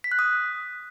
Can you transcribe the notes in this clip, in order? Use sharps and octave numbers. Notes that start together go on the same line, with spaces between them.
B6
F#6
D#6